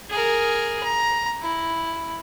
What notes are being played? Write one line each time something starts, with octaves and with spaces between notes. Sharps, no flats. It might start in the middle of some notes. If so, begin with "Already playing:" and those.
G#4 A#4
A#5
E4